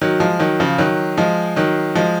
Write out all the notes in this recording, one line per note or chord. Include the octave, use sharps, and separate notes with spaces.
D#3 F#3
F3 G#3
D#3 F#3
C#3 F3
D#3 F#3
F3 G#3
D#3 F#3
F3 G#3